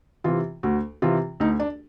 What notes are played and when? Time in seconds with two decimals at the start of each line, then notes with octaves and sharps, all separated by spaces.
0.24 C3 E3 F4
0.63 D2 F#4
1.02 C3 E3 F4
1.40 D2 D#4
1.60 D4